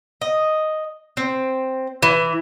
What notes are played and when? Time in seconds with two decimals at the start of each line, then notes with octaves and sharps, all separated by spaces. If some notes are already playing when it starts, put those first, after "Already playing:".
0.21 D#5
1.17 C4
2.02 E3